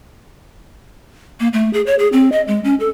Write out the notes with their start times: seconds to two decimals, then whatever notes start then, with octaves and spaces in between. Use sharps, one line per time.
1.40 A#3
1.53 A3
1.73 G#4
1.86 C#5
1.99 G#4
2.13 C4
2.32 D#5
2.48 G#3
2.64 C#4
2.80 A4